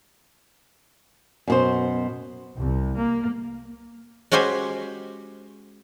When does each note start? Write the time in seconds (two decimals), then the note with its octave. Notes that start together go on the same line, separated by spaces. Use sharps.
1.48 F#2 B2 C5
2.59 C2
2.96 A#3
4.32 G#3 C#4 F#4 G4 C5 G#5